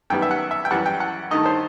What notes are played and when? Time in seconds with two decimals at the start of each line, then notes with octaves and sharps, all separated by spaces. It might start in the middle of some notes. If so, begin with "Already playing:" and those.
0.10 F#2 D#3 G3 B3 G5
0.22 E5
0.31 F#5
0.51 E5
0.65 G5
0.71 F#2 E3 G3 F#5
0.86 G5
1.00 F#5
1.31 G2 D#3 A3 D#4 D#5
1.46 C5